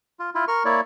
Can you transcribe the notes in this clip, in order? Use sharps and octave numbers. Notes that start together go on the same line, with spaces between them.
F4
E4 F4
A#4 C#6 F6
A#3 E4 C#5 D5